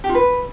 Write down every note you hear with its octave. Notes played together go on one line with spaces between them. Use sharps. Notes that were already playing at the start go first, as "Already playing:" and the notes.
G4
F4
B4